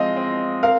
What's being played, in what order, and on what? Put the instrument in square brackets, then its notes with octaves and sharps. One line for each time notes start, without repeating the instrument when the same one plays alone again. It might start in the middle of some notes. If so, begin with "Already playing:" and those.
Already playing: [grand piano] F3 G#3 C4 [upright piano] D#5 F5
[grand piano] C4
[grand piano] A#4 [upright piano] F5